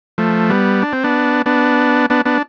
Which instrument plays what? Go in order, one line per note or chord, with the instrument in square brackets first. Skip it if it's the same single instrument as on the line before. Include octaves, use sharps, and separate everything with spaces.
[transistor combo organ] F3 A3
G3 B3
D4
C4
B3 D4
B3 D4
B3 D4
B3 D4